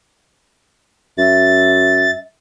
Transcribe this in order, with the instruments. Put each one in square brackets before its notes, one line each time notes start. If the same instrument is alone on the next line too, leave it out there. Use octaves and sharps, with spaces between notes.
[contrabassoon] F#2 [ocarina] E5 [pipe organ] A6